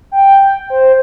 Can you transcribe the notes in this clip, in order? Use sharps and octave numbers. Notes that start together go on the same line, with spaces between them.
G5
C5